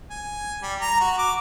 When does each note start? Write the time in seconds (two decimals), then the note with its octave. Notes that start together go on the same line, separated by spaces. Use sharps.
0.11 G#5
0.63 G3
0.81 A#5
1.01 F#4
1.19 D6